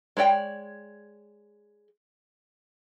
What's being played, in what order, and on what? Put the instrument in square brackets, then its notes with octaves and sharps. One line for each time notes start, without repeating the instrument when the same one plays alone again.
[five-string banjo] G#3 C#5 D5 G5